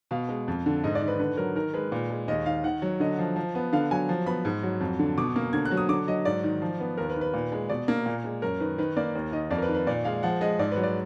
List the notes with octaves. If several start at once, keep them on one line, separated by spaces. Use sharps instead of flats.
B2 F5
G#3
F2
D3
G#2 D#5
D5
D#3
B4
D3 B4
F#3 A#4
D#3 A#4
G#3 B4
A#2
G#3
D#2 D#5
D#3 F5
D#3 F#5
F#3
D3 D#5
F3
F3
B3
D3 F5
F#3 G#5
F3
B3 B5
G#2
F#3
F2
D3
B2 D6
A#3
D3 G#6
F#6
F#3
D#6
D3 D6
F#3 D#5
G#2 D5
D#3
F3
B3
D#2 A#4
B4
D#3
B4
A#2
G#3
B2 D5
A#3
A#2
G#3
F#2 A#4
D#3 B4
D#3 B4
A#3 D5
D#2
D#3 D#5
F2 D5
A#4
B4
D#3
B4
A#2 D5
G#3 F5
F3 F#5
G#3 D#5
G#2 D5
B4
F#3
D5